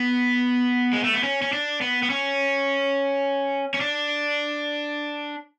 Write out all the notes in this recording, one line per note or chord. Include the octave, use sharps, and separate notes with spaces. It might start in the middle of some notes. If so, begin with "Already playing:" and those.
Already playing: B3
G#3
A3
B3
C#4
C#4
D4
B3
B3
C#4
C#4
D4